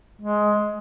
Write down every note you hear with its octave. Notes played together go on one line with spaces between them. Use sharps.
G#3